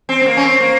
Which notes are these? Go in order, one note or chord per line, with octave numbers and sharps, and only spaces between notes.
C4
C4
A#3
C#4
C4
A#3